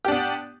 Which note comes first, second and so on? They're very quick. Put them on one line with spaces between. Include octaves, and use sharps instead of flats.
G4 D4 B3